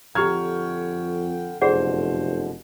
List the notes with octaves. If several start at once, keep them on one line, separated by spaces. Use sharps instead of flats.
F2 D3 G4 G5 A#5 C#6 F6 G#6
F1 F#2 B2 D3 G#4 C5 D5 F#5